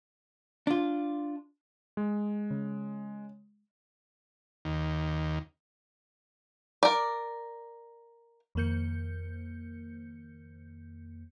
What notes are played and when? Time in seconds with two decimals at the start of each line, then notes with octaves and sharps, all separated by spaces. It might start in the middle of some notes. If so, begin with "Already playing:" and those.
0.67 D4 F4
1.97 G#3
2.51 C#3
4.65 D#2
6.83 A#4 D5
8.55 F2 D#3 A#3 G6 C#7